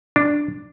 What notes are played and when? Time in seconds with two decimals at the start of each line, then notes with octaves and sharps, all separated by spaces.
0.16 D4